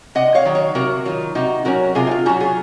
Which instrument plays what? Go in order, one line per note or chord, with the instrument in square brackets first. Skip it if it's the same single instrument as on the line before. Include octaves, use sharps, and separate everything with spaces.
[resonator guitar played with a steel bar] C3 D#5 F#5
C#5 F5
D#3 F#3
C#5 F5
C3 F#4 A#4
D#3 F#3 F4
C3 D#4 F#4
F#3 C#4 F#4 A#4
C3 F4 G#4
D#4
F4
F#3 C#4 D#4 F#4
F4 G#4